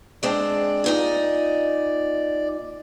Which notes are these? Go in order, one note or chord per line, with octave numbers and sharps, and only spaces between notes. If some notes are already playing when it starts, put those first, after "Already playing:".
G#3 C4 D4 D5
A#2 D#4 D#5